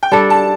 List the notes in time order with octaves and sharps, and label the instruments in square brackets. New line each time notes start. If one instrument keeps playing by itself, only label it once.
[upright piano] G5
[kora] G3 D4 A4 [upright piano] A5
[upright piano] A5